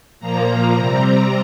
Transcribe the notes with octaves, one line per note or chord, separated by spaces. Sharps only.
A#2 F3 A#3 A#5
C3 G3 C4